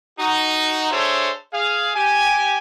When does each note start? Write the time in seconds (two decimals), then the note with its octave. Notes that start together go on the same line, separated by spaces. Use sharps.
0.19 D#4 F#4
0.91 D4 G#4 A4 C5 C#5 E5
1.53 G#4 F5
1.95 G4 G#5